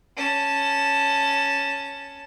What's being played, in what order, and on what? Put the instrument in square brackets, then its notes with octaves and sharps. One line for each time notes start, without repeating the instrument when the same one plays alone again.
[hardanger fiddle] C#4 A5